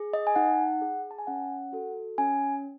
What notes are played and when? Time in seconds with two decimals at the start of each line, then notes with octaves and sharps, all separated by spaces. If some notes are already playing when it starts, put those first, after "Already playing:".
Already playing: G#4
0.13 D#5
0.27 G#5
0.35 D#4 F#5
0.82 G#4
1.11 A5
1.19 G#5
1.27 C#4 F#5
1.73 F#4 A4
2.18 C#4 G#5